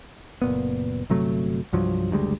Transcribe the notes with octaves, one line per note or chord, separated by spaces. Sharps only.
F#1 A#2 B3
G1 C3 F#3 A3
C2 G2 F3 F#3
F#1 D2 G3 G#3